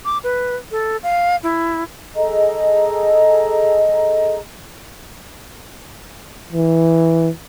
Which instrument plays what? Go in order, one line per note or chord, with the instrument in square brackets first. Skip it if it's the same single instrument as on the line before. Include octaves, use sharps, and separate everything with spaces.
[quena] D6
B4
A4
F5
E4
[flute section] G#4 A4 D#5 A#5
[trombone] E3